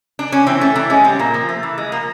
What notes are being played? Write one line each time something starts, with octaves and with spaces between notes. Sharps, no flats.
D4
C#4
E3 C4
A3 C#4
E3 D4
G#3 C#4
G3 C4
A#2 A#3
F3
A3
E3
G#3
F3 A#3